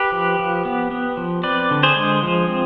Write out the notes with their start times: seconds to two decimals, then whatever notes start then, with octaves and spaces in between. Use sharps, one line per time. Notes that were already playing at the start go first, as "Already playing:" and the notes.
Already playing: G4 B4
0.12 F3
0.39 F3
0.65 B3
0.91 B3
1.17 F3
1.43 C4 B4 D5
1.71 D3
1.83 G#4 C5
1.96 G#3
2.23 F3
2.48 C4